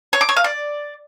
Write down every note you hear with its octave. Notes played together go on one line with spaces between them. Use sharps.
C#5
D6
C#5
F5
D5